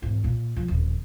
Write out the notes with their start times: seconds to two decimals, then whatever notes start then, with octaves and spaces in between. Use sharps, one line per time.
0.02 G#1 E2
0.24 A#2
0.56 F3
0.68 D#1 F2